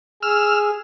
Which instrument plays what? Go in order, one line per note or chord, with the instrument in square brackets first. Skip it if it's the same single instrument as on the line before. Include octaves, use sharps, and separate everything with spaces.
[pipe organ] G#4 [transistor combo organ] E6 F6